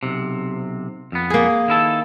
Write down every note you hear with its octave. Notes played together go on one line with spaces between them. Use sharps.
B1 C3
F2 B3
A#3 G#4
D#3 E4 A4